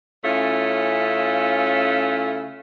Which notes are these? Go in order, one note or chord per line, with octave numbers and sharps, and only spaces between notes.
C#3 A3 C#4 E4 F4